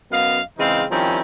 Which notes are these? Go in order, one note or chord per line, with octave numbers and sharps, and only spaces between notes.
F#2 B3 D#5 F5
C#3 E3 G#3 C4 D#4 F5
D#3 F3 G3 C4 C#4 E4